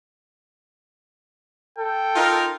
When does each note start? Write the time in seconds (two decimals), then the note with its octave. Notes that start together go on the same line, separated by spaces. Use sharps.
1.79 A4 G5
2.16 D#4 F4 A#4